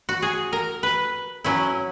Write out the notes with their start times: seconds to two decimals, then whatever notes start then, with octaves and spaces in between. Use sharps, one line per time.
0.09 F#4
0.22 G#4
0.53 A#4
0.83 B4
1.44 F#3 C#4 E4